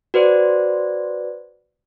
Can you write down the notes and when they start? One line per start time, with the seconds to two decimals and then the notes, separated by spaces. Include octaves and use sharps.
0.14 F#4 B4 C5 D5